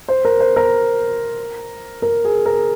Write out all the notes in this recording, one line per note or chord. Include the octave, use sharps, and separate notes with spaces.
C5
A#4
C5
A#4
A#4
G#4
A#4